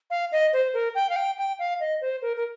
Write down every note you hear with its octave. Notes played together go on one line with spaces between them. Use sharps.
F5
D#5
C5
A#4
G5
F5
G5
G5
F5
D#5
C5
A#4
A#4